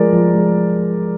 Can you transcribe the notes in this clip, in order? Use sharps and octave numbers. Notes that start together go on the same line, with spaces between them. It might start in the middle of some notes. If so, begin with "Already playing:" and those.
Already playing: F3 G#3 A#4 D5
F3
G#3